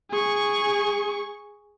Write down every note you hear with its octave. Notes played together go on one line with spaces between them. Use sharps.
G#4 C#6